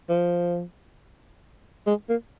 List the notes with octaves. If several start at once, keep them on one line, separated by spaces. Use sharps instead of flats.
F3
G#3
A#3